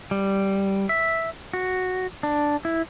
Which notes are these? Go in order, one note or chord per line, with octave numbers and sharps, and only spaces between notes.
G3
E5
F#4
D4
E4